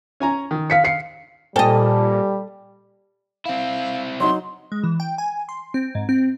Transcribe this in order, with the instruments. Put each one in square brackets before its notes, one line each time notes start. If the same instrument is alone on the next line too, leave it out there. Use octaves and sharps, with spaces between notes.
[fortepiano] C#4 G#5 A#5
D#3
[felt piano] F5 B6 C#7
F5 C7 C#7
[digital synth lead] A#2 [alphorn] G3 [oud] A4 D#5 [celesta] C5 G5 G#5
[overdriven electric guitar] C4 E4 [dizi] F5
[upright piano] F#3 D#4 [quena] C6
[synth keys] G#3
E3
G5
G#5
C6
C4
G#2
C4